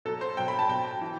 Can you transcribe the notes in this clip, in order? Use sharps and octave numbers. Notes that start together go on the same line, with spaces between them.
B2 F#3 A4
C5
B2 F#3 G5
B5
A5
B2 F#3 G5
E3